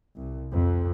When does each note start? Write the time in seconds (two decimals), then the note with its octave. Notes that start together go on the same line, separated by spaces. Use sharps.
0.16 C2
0.51 F2